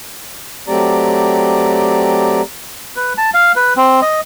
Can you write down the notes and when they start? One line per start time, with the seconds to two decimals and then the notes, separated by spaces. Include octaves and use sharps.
0.68 F#3 A3 C4 G4 D5 A#5
2.96 B4
3.18 A5
3.34 F5
3.56 B4
3.77 C4
4.02 D#5